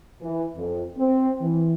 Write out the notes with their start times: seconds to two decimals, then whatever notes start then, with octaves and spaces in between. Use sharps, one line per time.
0.22 E3
0.56 F2
0.98 C4
1.42 E3